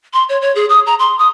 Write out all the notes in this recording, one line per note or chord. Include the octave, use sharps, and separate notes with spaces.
C6
C#5
C#5
G#4
D#6
A#5
C6
D#6